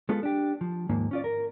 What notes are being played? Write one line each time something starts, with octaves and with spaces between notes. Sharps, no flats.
G#3 B3 F4 A4
D4 G4
F3
D#2 G#2 F3 A#3
C#4 F4 D5
A#4